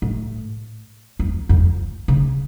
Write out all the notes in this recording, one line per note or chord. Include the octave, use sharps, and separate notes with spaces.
A2
F2
F2
C#3